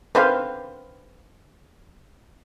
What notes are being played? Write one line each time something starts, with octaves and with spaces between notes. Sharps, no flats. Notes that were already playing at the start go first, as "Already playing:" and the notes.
D3 D#3 C4 B4 C5 F5